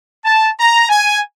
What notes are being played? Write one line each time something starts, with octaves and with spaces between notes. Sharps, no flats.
A5
A#5
G#5